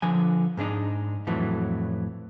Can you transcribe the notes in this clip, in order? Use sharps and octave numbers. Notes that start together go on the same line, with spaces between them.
D3 F3 G#5
G#2 G#3 D4 D#4
F2 A2 E3 F#3 A3